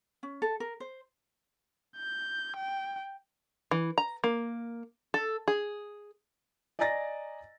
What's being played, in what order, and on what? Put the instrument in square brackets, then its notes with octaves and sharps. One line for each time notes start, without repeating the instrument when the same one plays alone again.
[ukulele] C#4
A4
A#4
C5
[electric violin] G6
G5
[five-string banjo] E3
A#5
A#3
A4
G#4
[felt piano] D5 D#5 G#5 A#5 A6 A#6